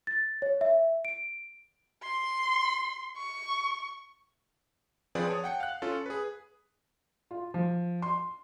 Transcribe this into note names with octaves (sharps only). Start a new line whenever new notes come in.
A6
C#5
E5
D7
C6
C#6
F3 C4 G#4 B4 D5 F5
C#5 A5 D#6
F#5 G5 C#7
F5 F#6
C#4 F4 A4
G#4 B4
F4
F3
C6